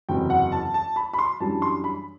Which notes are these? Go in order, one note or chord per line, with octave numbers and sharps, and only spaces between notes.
F#1 E2 C3 F#3 G5
F#5
A5
A5
B5
B5
C6
F#2 E3 G3 D4 A5
C6
B5